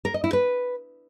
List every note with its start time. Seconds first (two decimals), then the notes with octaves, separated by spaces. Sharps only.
0.05 A#4
0.14 D#5
0.24 E4
0.33 B4